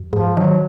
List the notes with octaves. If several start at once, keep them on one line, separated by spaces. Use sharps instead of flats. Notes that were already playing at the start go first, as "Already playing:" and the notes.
Already playing: F#2
G#2 F3
D#3 F#3